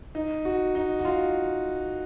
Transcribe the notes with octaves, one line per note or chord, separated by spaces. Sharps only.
D#4
F#4
D#4
F#4
F4